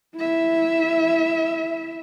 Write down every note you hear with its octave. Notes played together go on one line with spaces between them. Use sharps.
E4 E5